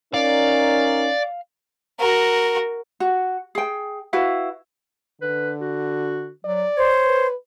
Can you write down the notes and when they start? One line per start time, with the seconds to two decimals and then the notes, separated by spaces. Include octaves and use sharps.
0.14 C#4 D#4 A#4 D5 F5
2.00 F#4 A#4
3.00 F#4
3.55 G#4 G5
4.13 E4 F#4 B4 F5
5.21 D3 B4
5.61 F#4
6.45 F#3 D5
6.77 C5 C#5
7.06 B4